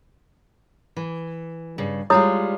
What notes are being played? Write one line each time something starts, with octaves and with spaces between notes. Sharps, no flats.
E3
G2 C#3
G3 G#3 E4 F4 C#5 D#6